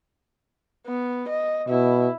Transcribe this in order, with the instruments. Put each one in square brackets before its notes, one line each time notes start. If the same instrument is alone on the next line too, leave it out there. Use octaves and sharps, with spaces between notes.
[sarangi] B3
D#5
[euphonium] B2 [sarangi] E4